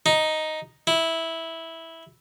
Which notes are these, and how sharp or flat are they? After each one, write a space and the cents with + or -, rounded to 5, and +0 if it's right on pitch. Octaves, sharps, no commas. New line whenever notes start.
D#4 +0
E4 -10